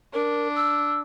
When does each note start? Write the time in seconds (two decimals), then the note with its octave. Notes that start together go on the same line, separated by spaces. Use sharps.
0.14 D4 A#4
0.56 E6